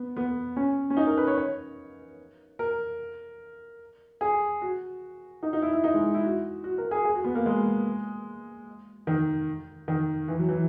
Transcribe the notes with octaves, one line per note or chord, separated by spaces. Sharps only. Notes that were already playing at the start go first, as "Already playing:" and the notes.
Already playing: B3
B3
C#4
C#4
D#4
A#4
B4
C#5
C#5
A#4
G#4
F#4
D#4
D#4
E4
E4
D#4
G#3
E4
F#4
F#4
A#4
G#4
G#4
F#4
B3
A#3
G#3
D#3
D#3
E3
F#3
E3